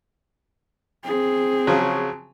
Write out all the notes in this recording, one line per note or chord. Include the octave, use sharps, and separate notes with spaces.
C4 G#4
C#3 F3 F#3